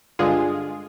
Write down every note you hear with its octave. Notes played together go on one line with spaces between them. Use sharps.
G2 D3 G#3 F4 G#4